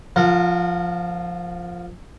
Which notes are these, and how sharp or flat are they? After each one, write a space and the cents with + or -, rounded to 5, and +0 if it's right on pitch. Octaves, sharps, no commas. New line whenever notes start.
F3 +0 A#4 -25 F#5 -40